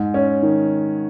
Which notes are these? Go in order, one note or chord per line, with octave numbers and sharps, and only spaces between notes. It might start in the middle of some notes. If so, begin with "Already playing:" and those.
Already playing: G#2
C#4
D#3